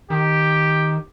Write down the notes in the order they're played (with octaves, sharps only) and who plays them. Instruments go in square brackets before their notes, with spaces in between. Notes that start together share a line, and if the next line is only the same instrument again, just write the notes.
[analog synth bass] D#3 [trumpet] G4